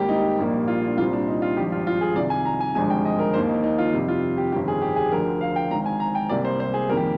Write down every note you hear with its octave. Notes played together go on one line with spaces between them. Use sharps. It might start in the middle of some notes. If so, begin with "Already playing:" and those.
Already playing: G#1 G#2 G3 A#3 G4
D#4
A#1 A#2 G3 A#3
F4
D4
C2 A#2 G3 C4 F4
D4
D#4
F4
G#1 G2 F3 G4
F4
F4
G#4
C2 C3 D#3 D5
G#5
A#5
G#5
G#1 G2 D3 F3 G#3 G#5
G5
D#5
A#4
D#2 D#3 A#3 C5
D#4
D#4
F4
F2 C3 G3
F4
G4
G1 F2 D#3 G4
G#4
G4
G#4
D2 D3 F3 A#4
F5
G5
G#1 G#2 D#3 A#5
G#5
A#5
G5
C2 C3 G3 A#3 D5
C5
C5
G#4
F2 D#3 G3 A#3 A#4
G4